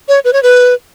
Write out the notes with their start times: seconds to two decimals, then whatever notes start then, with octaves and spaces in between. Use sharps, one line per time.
0.08 C#5
0.25 B4
0.33 C#5
0.43 B4